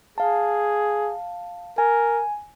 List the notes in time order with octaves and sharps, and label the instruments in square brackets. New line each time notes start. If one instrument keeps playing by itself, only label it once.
[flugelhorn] G#4 [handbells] F5 A5
[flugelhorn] A#4 [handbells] G#5